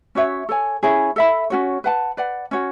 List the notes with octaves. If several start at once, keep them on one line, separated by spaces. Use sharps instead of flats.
C#4 F#4 C#5 E5
A4 C#5 G#5
C#4 E4 G#4 C#5
A4 E5 B5
C#4 F#4 C#5
B4 F#5 A5
B4 D5 F#5
C#4 F#4 C#5